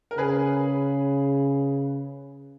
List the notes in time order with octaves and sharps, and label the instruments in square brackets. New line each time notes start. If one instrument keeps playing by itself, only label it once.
[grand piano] A#4
[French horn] C#3 [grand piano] G#4 B4